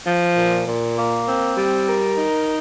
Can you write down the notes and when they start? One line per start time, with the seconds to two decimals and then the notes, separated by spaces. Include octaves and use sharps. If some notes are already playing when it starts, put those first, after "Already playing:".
0.07 F3
0.37 A#2
0.67 A#2
0.97 A#3
1.28 C4
1.58 G3
1.88 A#4
2.18 D#4